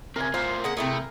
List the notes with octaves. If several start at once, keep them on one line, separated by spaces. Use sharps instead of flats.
C#3 C4 A#4 G#5
A2 F4 C5 F5
G#3 A#3 C#4 F#5
C3 A3 E4 G#4